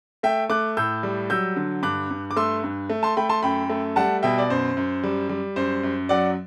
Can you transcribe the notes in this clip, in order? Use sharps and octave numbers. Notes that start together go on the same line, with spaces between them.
A3 E5 G5
A3 D6 F#6
A2 E6 G6
G3
F#3 E6 G6
D3
G2 D6 F#6
G2
D6
A3 C6 E6
G2
A3
A5 C6
A3 G5 B5
A5 C6
F#2 G5 B5
A3
G3 F#5 A5
B2 E5 G5
D5
F#2 C5
F#2
G3
G3
F#2 C5
F#2
F#3 D5 F#5